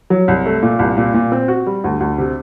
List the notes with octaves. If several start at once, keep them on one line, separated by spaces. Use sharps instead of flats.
F#3
C2
A3
A#2
C2
A#2
A#2
C4
F#4
G3
D2
D2
C3